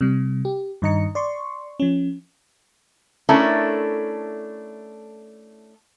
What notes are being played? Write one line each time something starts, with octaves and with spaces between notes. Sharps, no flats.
C3 G3
G4
G2 D#3 D#5 A#5 C#7
D5 C6 C#6
F3 C#4
A3 C#4 D4 E4 A4 A#4